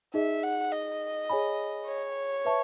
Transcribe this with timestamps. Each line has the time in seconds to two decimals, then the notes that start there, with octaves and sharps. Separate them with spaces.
0.14 D#4 G#4 D#5 E5
0.43 F#5
0.72 D#5
1.30 G#4 C#5 G#5 B5
1.87 C#5
2.45 B4 E5 A5 C#6